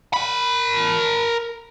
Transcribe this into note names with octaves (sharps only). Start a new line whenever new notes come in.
A#4 B5